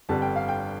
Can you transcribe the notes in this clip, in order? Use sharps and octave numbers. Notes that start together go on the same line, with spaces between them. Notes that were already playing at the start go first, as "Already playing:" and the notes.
G1 F2 D3 G3 A5
G5
F5
G5